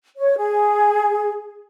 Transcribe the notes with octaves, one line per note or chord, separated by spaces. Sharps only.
C#5
G#4